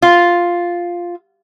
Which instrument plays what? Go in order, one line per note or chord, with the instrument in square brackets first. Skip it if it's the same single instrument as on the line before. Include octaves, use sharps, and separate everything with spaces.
[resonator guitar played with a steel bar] F4